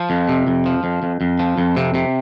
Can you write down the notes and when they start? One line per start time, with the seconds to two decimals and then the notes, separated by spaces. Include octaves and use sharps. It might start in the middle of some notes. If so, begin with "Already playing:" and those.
Already playing: F3
0.10 F2
0.29 C3
0.47 F2
0.66 F3
0.84 F2
1.03 F2
1.21 F2
1.39 F3
1.58 F2
1.77 C3
1.94 C3